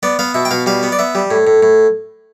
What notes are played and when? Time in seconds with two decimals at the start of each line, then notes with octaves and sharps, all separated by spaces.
0.03 B3 D5
0.19 B3 F5
0.34 B2 E5
0.45 G5
0.51 B2 F5
0.66 G3 F5
0.83 B3
0.92 D5
0.99 B3 E5
1.15 G3
1.31 A2
1.47 A2
1.63 A2